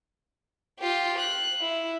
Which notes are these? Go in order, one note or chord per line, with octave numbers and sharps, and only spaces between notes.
F4 G4
F#6
E4